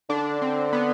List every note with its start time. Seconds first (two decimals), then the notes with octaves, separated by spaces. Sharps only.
0.10 D3 D4
0.42 C4
0.73 B3